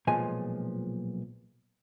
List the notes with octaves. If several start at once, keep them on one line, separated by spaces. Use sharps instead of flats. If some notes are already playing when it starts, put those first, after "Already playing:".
B1 A#2 F3 G#3 G#5